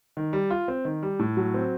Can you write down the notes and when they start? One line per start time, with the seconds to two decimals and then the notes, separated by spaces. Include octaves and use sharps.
0.17 D#3
0.33 G3
0.50 F4
0.68 C4
0.85 D#3
1.03 G3
1.19 A2
1.37 F#3
1.54 C4